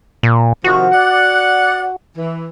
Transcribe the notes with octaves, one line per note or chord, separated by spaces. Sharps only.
A#2
C3 D#3 F3 F#4
D5 F#5
E3